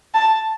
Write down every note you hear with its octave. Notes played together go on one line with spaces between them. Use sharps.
A5